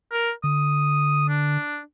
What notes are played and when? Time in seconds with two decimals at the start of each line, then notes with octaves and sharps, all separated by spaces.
0.13 A#4
0.44 D3 D#6
1.29 D4